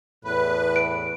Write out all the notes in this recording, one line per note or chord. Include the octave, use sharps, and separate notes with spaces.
E2 A2 B4
D7